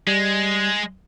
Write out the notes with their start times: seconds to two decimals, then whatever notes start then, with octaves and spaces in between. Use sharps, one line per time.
0.07 G3 G#3